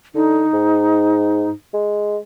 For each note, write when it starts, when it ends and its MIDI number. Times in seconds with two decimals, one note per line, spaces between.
0.15 0.44 50
0.15 1.50 63
0.53 1.49 44
1.74 2.17 56